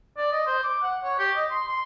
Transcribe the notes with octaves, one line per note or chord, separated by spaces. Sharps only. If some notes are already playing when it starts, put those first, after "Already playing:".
D5
D#5
C5
D6
F#5
C#5
G4
D#5
C6
C6